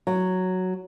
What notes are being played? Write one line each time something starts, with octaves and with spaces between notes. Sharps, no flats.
F#3